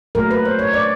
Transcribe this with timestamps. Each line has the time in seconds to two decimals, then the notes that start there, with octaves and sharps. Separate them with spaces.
0.15 A#2 F#3 A3 A#4
0.31 B4
0.45 C5
0.59 C#5
0.73 D5